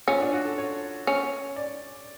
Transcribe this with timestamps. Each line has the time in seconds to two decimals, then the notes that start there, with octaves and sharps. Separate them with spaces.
0.07 C#4 F4
0.21 D4
0.33 F#4
0.45 A4
0.58 C#5
1.07 C#4
1.56 D5